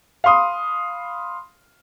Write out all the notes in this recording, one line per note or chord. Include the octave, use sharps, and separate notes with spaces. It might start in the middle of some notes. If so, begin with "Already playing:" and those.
F5 B5 C6 D#6